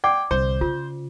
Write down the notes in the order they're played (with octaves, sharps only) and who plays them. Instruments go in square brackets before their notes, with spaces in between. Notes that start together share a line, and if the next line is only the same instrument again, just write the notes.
[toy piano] D5 F#5 D6 [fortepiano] G5
[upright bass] C2 D3 [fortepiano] C5
[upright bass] C#3 [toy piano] F4